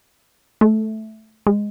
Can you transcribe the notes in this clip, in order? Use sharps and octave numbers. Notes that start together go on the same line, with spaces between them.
A3
G#3